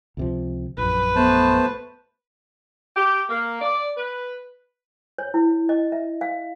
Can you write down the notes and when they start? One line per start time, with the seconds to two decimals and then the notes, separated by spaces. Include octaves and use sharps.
0.17 C#2 C3 F3
0.78 A#1 F#2 B4
1.16 A3 B3 C5 A5
2.96 G4
3.29 A#3
3.61 D5
3.97 B4
5.18 C#5
5.34 E4
5.69 D#5
5.92 E5
6.21 F5